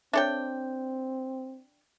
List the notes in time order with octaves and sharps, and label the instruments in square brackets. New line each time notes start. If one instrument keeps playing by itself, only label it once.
[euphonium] C4 [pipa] D4 A4 G5 [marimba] C#5 E5